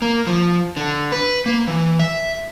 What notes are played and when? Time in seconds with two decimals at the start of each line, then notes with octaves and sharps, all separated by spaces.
0.02 A#3
0.27 F3
0.77 D3
1.12 B4
1.46 A#3
1.67 E3
1.99 E5